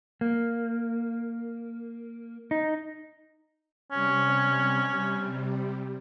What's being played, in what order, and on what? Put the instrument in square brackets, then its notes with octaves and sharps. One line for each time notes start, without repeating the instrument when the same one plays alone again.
[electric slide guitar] A#3
D#4
[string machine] C3 G3 [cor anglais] C#4